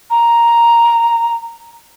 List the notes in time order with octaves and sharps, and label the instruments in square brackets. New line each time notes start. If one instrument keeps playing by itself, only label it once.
[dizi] A#5